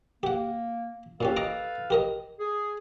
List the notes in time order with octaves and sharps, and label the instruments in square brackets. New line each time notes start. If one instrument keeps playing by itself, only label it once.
[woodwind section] A#3 [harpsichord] G4 F#5
[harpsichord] A#2 C#4 G4 [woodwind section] A4 B4 F5
[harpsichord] D#5 A#5 D6
G4 A#4 D#5
[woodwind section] G#4